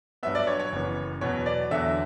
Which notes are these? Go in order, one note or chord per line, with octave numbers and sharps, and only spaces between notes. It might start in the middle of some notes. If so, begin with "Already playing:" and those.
G2 F#3 B3 E5
D5
C#5
C#5
F#1 F#2 E3 B3
E2 B2 F#3 B3 C#5
D5
E2 D3 F#3 E5